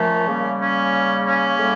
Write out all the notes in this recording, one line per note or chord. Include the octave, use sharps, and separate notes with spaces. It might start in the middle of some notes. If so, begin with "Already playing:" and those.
Already playing: A#2 F3 A3 C#4
C#3 G3 A#3
C#4
C#4
A2 G3 A#3